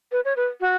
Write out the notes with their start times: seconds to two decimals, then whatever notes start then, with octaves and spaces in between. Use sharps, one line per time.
0.12 B4
0.25 C#5
0.36 B4
0.61 F#4